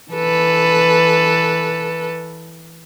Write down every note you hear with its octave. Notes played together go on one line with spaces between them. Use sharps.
E3 A4 B4